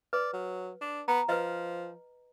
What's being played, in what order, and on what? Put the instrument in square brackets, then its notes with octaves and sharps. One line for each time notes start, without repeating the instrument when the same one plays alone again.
[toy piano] B4 [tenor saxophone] D5
[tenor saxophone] F#3
D4
[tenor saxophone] B3 [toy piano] A#5
[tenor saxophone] F3 [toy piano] B4 D#5